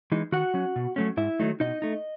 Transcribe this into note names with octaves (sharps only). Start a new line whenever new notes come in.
E3 G#3 D#4
D#3 F#4 F#5
F#3 C#4
B2
F#3 A3 C#4
G#2 E4 E5
D#3 F#3 A3 D#4
B2 D#4 D#5
A3 D#4